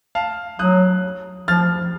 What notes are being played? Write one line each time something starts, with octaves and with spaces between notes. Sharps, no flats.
F5 A5
F#3 D#6 F#6
F3 F6 A6